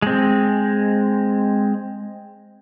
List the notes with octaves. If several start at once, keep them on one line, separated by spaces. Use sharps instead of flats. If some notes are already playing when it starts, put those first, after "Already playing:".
G#3 C4